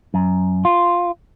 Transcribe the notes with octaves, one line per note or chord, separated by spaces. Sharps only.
F#2
F4